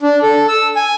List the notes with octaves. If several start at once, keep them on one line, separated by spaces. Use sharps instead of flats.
D4
A4
E6
G#5